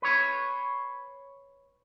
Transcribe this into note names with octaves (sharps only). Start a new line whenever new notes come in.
B4 C#5